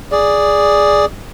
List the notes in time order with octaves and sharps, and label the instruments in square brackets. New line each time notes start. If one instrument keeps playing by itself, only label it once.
[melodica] G#4 D5